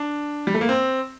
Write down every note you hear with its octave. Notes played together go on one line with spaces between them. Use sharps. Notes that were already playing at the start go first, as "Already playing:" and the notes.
Already playing: D4
G3
A3
A#3
C4